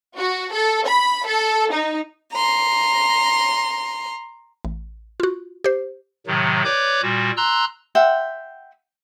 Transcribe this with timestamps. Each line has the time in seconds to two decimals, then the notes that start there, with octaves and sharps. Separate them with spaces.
0.18 F#4
0.54 A4
0.87 B5
1.27 A4
1.72 D#4
2.31 A#5 C6
4.65 A1
5.20 F4 F#4
5.64 G4 C5
6.27 A2 C3 D#3 F#3
6.65 B4 C#5 D5 D6 G6
7.02 A#2 G3 F#4
7.37 A#5 C6 E6 F#6
7.95 E5 F#5 G5 C6